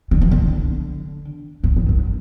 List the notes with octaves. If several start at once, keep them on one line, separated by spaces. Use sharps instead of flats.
D3
E3
D3
G2
E2
F#2